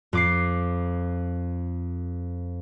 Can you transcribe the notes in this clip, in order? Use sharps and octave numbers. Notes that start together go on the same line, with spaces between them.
F2 D6 C7